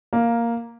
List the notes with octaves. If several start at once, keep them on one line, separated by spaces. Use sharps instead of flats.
A#3